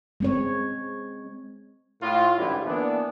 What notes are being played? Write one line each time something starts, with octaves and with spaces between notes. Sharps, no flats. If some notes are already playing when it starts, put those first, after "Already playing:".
G#3 C4 C#5
A2 F4
A1 D2 G#2 E3 G3 E4
E3 A#3 B3 D4